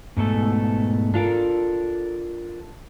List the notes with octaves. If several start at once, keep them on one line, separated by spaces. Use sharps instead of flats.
G#2 B2 A3 A4
D4 F4 A4 A#4